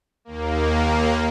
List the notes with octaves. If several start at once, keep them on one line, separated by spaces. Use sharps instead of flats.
D#2 A#3